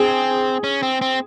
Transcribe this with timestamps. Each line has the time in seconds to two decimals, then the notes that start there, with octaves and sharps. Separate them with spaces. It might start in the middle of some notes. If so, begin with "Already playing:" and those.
Already playing: C4 G#4
0.64 C#4
0.83 C4
1.02 C4